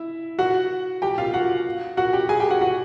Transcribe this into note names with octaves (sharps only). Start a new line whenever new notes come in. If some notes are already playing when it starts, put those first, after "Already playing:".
Already playing: E4 E5
F#4 F#5
G4 G5
F4 F5
F#4 F#5
F#4 F#5
G4 G5
G#4 G#5
G4 G5
F#4 F#5
F#4 F#5